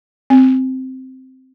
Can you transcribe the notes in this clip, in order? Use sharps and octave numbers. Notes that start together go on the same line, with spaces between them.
C4